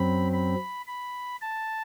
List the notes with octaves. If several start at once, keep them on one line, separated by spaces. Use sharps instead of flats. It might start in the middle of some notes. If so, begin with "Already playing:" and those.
Already playing: F#2 F#3 C4 B5
B5
B5
A5